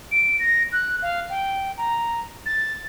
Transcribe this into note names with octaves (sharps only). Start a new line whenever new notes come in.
D7
A#6
F#6
F5
G5
A#5
A6